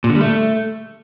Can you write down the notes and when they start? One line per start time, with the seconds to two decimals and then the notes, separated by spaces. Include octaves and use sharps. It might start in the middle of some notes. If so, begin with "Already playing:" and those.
0.04 A#2
0.10 D3
0.15 G3
0.21 A3